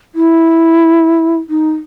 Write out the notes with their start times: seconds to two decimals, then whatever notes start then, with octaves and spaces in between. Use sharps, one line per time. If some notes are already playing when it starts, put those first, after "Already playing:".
0.15 E4
1.49 D#4